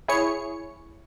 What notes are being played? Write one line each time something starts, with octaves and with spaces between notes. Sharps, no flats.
E4 G#4 C#5 C#7